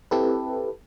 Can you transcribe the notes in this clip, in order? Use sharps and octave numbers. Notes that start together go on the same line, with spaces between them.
C4 E4 G4 A4 B4